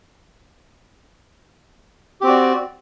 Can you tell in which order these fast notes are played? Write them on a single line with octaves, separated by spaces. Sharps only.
G4 C4 F#4 D5